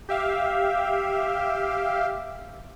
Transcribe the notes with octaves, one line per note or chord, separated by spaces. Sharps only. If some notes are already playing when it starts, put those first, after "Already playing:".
G4 E5 F5